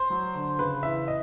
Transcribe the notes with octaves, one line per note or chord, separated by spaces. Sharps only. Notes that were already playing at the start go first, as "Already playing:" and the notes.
Already playing: C5
F#3
D3
C#3 B4
E3 E5
D#5